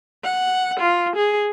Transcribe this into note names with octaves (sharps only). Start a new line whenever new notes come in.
F#5
F4
G#4